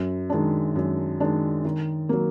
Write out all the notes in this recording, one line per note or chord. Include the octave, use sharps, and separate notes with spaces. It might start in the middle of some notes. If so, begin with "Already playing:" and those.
Already playing: F#2
D#3 G#3 D4
F#2
D#3 G#3 D4
D#3
F#3 A#3